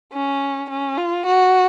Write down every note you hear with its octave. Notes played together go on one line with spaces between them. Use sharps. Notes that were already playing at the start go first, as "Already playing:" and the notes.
C#4
C#4
F4
F#4